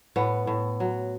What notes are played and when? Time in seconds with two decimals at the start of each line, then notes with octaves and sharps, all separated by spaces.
0.16 A2 B3
0.47 A2
0.80 F#3